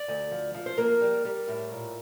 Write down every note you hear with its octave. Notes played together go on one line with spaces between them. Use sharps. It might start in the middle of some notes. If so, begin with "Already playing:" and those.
Already playing: D5
D2
F3
F3
C5
A#3 A#4
G3
G3
A2
A#2